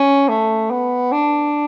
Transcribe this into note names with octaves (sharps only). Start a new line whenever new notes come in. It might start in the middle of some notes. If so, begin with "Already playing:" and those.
Already playing: C#4
A3
B3
D4